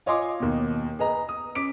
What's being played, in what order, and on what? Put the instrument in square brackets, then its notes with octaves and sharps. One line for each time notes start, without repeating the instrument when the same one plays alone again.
[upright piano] F4 C#5 D#5 G#5 C6 D6
D#2 B2
G#4 B4 D#5 A#5
D#6
C#4 D6 B6 D7